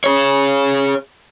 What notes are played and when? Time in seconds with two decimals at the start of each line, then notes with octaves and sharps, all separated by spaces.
0.04 G#4 C#5